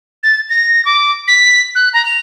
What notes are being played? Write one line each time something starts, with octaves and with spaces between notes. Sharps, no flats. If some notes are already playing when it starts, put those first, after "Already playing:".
A6
A#6
D6
B6
F#6
A#5
F7